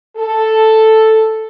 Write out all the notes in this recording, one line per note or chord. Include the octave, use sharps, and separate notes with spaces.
A4